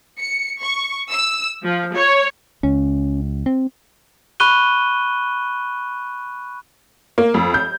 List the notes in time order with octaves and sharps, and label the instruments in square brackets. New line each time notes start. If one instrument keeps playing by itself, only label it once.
[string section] C#7
C#6
E6
F3
C#5
[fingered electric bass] C#2 [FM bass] C#4
[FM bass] C4
[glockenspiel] B5 C#6 F#6 D#7 G7
[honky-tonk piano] A#3
F2
G6